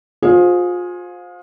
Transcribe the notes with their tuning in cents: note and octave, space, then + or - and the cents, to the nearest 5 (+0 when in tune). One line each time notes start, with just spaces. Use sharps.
F4 +30 G#4 +0 C5 +0